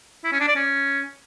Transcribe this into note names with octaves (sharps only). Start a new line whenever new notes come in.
E4
C#4
D4
D5
C#4